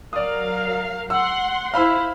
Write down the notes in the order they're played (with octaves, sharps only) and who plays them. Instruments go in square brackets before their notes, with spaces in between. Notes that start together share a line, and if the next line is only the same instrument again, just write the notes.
[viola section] F#3 A#4 F5 [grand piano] D5 D#6
[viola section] F#5 C6 [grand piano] E6
[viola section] E4 C5 [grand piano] F5 B5 E6